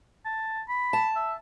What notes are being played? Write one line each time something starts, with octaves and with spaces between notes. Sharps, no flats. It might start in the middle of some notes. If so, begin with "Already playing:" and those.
A5
B5
A5
E5